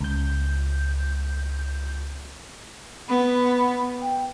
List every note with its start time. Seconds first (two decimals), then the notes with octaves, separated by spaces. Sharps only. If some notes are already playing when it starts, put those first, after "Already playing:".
0.01 C#2 G6
3.09 B3 B5
4.02 G5